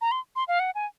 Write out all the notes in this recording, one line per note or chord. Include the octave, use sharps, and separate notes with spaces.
A#5
C6
C6
F5
F#5
G#5